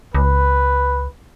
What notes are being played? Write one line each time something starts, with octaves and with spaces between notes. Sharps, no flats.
C#2 B4